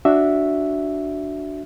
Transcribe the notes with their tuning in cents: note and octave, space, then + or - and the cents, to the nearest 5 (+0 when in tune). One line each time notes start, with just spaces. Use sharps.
D4 +0 F#4 +0 E5 +0